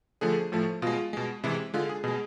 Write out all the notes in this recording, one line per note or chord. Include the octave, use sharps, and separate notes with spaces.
D3 F3 A3 G#4
A2 F3 A3
B2 G#3 F4
B2 G#3
C3 E3 G#3 E4
D3 G#3 F4
G#4
B2 G#3 G#4